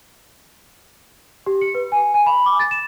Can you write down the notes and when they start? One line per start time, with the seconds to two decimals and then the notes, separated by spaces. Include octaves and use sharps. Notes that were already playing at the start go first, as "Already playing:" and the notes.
1.46 G4
1.61 C#7
1.75 B4
1.92 G#5
2.14 G#5
2.26 B5
2.46 D6
2.59 A6
2.71 E7